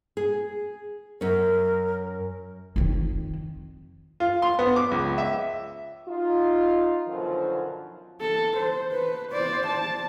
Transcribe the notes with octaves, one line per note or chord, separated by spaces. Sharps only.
G#4
F#2 C#4 A#4
F2 D#3
F4
C6
B3
D6
C#2
E5
D#4 F4
F#2 B2 D3 D#3 F3
A4
C5
B4
C5 D5
A5